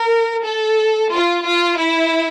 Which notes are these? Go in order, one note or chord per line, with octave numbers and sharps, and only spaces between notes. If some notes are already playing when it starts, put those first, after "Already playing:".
Already playing: A#4
A4
F4
F4
E4